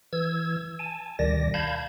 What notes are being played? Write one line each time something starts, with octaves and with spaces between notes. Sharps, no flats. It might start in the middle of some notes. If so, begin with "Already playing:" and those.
E3 E6 G#6
G#5 A5
D2 B2 D#3 G3 D5 A#6
F5 A5 B5 G6 G#6